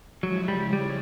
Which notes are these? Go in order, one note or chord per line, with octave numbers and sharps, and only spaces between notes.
C#3 F3 F#3 G#3 C#4 E4
G3
G3